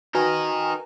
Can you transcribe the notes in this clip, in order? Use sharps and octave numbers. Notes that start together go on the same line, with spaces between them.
D#4 F#4 A#4 B4 G#5